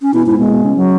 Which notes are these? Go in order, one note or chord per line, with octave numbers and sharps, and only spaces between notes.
C#4
B2 E4
G#2 E4
B2 G#3
B2
C#3
F#3